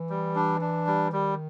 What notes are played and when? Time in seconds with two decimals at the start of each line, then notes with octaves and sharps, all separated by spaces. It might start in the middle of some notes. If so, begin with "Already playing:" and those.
Already playing: E3
0.10 G3
0.36 D4
0.61 D4
0.87 G3
1.12 D#3 G3